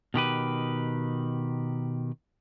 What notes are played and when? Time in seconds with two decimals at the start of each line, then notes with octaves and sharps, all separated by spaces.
0.14 B2 D#3 G4 B4